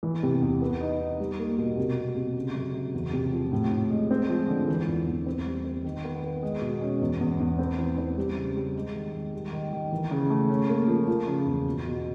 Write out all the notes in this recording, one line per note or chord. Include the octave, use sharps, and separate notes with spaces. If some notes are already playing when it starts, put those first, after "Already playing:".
E3
C3
E2
B3
D#4
D#4
G3
A#3
B2
C3
C3
C3
C#3
F#2
C#3
E2
C3
F3
A2
A2
G#3
C4
F3
D3
E3
E2
E2
C4
G3
C4
D#3
B3
B3
G#3
B2
C#4
E2
E2
E2
C4
E3
C4
G3
C#3
G3
G#3
D#3
D#3
G3
D#3
D#3
E3
C#3
A3
C#4
A#3
F3
F3
C#3
E2
B2
B2